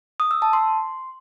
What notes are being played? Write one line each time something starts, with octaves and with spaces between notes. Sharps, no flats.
D#6
E6
A5
C6